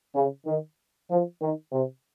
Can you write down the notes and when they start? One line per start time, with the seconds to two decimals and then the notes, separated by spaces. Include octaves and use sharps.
0.15 C#3
0.47 D#3
1.10 F3
1.41 D#3
1.73 C3